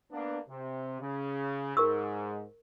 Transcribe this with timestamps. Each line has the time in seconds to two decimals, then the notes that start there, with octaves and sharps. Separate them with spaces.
0.12 A#3 B3 D4
0.48 C3
1.01 C#3
1.77 G#2 A#4 C#6 E6